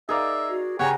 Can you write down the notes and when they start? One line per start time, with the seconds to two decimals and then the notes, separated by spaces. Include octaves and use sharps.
0.09 D#4 G#4 A#4 D5 E5 F5
0.50 F#4
0.79 C#3 G4 C#5 F#5 G#5 A#5